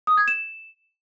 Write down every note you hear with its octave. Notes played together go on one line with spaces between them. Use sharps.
D#6
G#6
E7